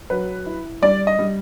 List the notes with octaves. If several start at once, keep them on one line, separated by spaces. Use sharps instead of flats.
F#3 B4
E4
G3 D5
D#5
G3